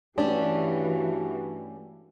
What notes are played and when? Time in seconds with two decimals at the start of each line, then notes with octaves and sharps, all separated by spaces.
0.18 G2 E3 A3 C#4 D4 F#4 G4